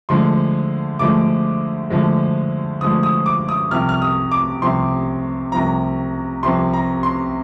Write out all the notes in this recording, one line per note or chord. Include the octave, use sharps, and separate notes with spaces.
D2 D3 F3 G#3 C6
D2 D3 F3 G#3 D6
D2 D3 F3 G#3
D2 D3 F3 G#3 D#6
D#6
D6
D#6
C2 C3 F3 F6
F6
D#6
D6
C2 C3 F3 C6
C2 C3 F3 A#5
C2 C3 F3 C6
A#5
C6